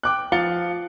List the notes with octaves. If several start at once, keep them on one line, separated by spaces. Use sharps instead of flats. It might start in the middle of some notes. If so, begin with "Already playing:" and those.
G5 D6 F#6
F3 F5 A6 C#7 G7